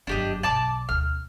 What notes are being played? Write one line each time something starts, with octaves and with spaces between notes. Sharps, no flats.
G1 F#2 D4 G4 D#5
B1 D5 A5 D6
D2 B2 F6